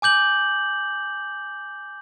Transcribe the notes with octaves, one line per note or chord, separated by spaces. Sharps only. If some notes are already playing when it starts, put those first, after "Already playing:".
G#5 D6 G6 F#7